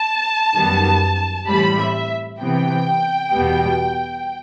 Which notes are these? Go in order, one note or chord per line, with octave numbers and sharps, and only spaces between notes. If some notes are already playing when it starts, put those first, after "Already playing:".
Already playing: A5
F#2 D#3 G3 B3
A2 E3 G3 C4 B5
E5
C3 E3 B3 G5
E2 B2 G3 B3